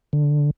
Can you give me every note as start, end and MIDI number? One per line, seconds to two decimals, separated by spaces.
0.13 0.51 50